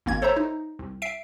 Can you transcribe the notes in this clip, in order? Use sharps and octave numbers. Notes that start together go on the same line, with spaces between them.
G#1 A#3 G#6
A4 C5 C#5 E5 A#5
D#4
C2
E5 C7 D7